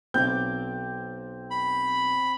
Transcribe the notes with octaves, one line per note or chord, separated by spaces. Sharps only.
B1 C4 D6 G6
B5